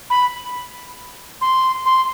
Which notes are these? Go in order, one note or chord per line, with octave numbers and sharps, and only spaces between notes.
B5
C6
C6